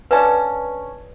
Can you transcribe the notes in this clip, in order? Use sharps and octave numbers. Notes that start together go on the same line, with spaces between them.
D3 C#4 B4 D5 A5